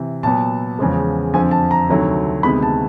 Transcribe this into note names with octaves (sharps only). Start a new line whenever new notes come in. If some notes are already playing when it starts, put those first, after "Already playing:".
Already playing: C3 E3
A#2 F#3 B3 A5
E2 C#3 F3 G#3
F2 D3 F3 G#5
A5
A#5
D2 C3 D#3 F#3 A3
D2 C3 D#3 G#3 B3 B5
A5